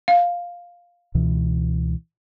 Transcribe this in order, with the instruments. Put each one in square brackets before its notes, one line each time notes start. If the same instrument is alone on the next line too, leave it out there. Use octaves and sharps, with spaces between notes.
[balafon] F5
[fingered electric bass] C#2 B2 E3